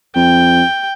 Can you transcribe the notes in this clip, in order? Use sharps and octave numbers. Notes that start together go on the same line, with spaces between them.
F2 G5